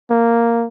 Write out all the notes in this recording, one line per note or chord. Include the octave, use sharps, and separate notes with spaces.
A#3